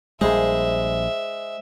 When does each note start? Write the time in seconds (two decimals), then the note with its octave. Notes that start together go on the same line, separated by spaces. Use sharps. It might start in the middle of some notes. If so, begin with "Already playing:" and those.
0.21 A#1 G3 G#3 G#4 C5 E5